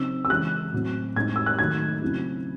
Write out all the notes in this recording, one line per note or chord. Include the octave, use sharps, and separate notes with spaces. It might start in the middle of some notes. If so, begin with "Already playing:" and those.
Already playing: C#3 F#3 C4 D#4 E6
E6
C#3 E3 G#3 F#6
A2 F#3 C4
A2 G#3 C4 D#4 G#6
E6
F#6
D#3 F#3 A3 D#4 G#6
C#3 F#3 C4 E4